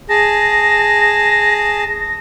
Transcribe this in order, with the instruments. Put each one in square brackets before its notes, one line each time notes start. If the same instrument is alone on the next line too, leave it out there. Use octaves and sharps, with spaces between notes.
[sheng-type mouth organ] G#4 A5 [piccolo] A#6